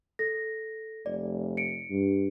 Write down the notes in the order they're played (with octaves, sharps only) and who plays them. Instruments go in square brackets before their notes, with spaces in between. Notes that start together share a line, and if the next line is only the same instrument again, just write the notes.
[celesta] A4 A#6
[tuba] F1 [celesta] D5
[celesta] C#7 D7
[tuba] G2